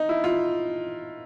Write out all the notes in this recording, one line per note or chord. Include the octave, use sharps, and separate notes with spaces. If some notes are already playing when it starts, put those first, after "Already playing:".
Already playing: D#4
E4
F4